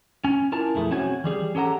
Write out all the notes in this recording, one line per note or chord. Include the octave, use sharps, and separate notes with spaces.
C#4 G#5
E4 F4 A#4 G#5 A5
B1 F2 A3 E4 G#4
C4 C#4 F#4 G#5
E3 G3 G#4
C#4 G4 A4 F#5 A#5